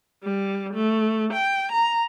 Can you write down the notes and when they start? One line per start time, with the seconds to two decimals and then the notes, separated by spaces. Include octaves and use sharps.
0.24 G3
0.74 A3
1.33 G5
1.72 A#5